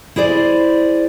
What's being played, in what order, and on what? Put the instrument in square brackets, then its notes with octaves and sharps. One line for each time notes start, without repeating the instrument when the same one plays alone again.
[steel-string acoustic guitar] E4 G#4 C5 D5